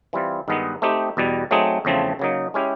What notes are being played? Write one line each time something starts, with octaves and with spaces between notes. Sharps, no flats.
E3 G3 C4 F4
G2 D#3 G#3 B3 D#4
A3 C4 D#4 G4
E2 B2 G3
F#3 A3 C4 D#4 G#4
E2 C#3 F3 A3 C4
C#3 F#3 A#3 D#4
G#3 C#4 E4 G4